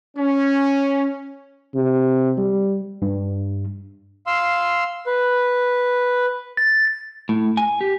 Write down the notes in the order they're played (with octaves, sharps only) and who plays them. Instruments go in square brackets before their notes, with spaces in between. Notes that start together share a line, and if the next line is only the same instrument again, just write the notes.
[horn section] C#4
[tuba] C3
G3
[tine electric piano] G2
[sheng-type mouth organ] F5 C6 E6
B4
[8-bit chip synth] A6
[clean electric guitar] A2
G#5
G4